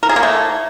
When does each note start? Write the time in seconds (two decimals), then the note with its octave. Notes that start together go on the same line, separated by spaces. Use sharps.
0.03 A#4
0.09 G#4
0.16 A#3
0.23 A3